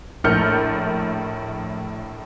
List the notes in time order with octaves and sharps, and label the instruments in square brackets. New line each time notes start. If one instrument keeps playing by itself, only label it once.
[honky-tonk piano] A#1 A2 A#4 F6 G6 C#7